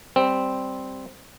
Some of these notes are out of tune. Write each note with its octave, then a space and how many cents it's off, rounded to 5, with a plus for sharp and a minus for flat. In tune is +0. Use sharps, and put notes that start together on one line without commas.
G3 +0 C4 +0